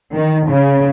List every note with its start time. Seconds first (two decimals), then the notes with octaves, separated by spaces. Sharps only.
0.14 D#3
0.48 C#3